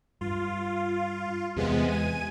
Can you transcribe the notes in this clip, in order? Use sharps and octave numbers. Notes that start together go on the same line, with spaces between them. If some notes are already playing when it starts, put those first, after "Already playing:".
G2 F4
E2 C3 G#3 B3
G#5 D#7